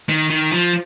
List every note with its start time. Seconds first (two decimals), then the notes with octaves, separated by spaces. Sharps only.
0.09 D#3
0.30 D#3
0.51 F3